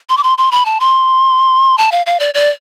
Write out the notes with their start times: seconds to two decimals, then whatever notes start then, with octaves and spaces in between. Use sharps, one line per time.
0.09 C6
0.17 D6
0.23 C6
0.38 C6
0.52 B5
0.65 A5
0.80 C6
1.78 A5
1.92 F5
2.06 F5
2.20 D5
2.34 D5